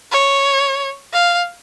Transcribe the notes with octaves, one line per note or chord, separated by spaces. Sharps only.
C#5
F5